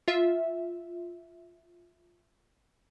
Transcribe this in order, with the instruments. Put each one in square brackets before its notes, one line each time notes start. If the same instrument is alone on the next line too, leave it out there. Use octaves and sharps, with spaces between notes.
[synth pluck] F4 E5